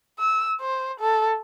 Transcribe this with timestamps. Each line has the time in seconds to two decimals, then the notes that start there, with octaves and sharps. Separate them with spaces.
0.19 E6
0.60 C5
1.00 A4